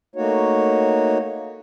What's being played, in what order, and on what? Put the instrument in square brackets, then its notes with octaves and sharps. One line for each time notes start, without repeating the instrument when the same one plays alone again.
[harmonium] A3 A#3 D#4 F#4 C#5